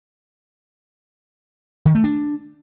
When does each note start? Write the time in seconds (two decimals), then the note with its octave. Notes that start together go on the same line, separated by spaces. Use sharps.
1.85 D#3
1.95 A3
2.04 D4